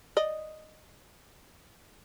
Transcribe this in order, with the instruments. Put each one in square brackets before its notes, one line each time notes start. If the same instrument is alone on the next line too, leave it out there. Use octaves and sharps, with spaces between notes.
[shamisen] D5 D#5